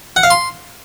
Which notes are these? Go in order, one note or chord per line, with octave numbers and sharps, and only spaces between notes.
F#5
F5
C6